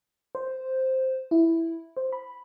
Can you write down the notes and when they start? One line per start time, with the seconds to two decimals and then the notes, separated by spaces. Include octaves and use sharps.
0.35 C5
1.31 E4
1.97 C5
2.13 B5